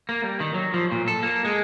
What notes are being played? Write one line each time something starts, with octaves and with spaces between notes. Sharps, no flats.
A#3
G3
D#3
F#3
F3
A#2
A4
A#3
G#3